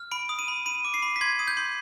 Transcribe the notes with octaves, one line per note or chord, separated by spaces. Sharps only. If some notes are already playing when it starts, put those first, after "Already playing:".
Already playing: F6
B5 D7
D#6
D#7
B5
B5 D#7
D6
C7
B5
B6
C6 G#6
D#6
G6
C6